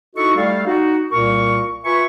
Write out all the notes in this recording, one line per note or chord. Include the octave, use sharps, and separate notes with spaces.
D#4 E4 F#4 A4 D#5 C#6
G3 A3 A4 F5
D#4 F#4
C2 A#2 A#3 A#4 C#6
F4 B4 E5 G#5 C#6